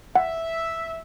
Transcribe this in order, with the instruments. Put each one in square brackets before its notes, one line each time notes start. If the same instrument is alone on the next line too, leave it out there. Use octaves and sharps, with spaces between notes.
[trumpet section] E5 [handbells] F#5